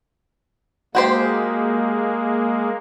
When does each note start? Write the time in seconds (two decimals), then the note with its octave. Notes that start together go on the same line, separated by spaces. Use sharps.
0.95 G#3 A#3 F#4 G4 C5